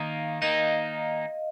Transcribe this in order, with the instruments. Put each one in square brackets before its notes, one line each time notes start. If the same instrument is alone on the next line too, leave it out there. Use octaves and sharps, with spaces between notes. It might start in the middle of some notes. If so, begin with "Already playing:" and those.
Already playing: [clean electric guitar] D#3 A#3 D#4 [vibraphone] F5
[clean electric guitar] D#3 A#3 D#4 [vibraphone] D#5